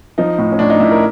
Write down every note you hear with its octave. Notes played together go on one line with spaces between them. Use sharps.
F3 D#4
A2
C#4
A2 D4
D#4
A2 E4
A#4